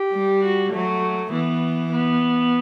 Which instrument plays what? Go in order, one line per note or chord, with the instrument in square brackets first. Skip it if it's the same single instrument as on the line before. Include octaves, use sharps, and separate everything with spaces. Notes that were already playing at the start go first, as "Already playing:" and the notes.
Already playing: [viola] G4
[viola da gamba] G3
[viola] F#4
[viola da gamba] F#3 [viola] A3
[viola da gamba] E3 [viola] B3
[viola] B3